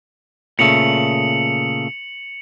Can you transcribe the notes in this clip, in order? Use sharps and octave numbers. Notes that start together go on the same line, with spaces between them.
A#2 C#3 A3 C#7 F7 F#7